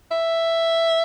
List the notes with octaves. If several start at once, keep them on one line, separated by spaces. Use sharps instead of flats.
E5